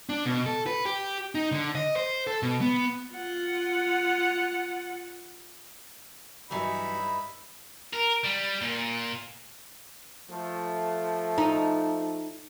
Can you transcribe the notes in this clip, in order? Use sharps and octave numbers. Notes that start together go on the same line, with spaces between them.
D4
B2
A4
B4
G4
D#4
D3
D#5
C5
A4
B2
B3
F4 F#5
G2 E3 F#3 D#4 E4 B5
A#4
G3
A#2
F3 A3
D#4